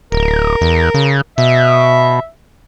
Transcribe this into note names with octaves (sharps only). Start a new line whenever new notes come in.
D1 A#4
E2
C#3
B2 E5